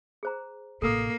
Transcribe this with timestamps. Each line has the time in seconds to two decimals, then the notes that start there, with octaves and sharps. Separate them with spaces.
0.23 G#4 C5 A#5
0.82 A1 C3 A#3 A4 A#4 D#6